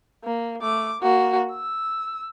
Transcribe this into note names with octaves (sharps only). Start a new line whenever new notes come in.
A#3
A3 D6
A#3 F#4
E6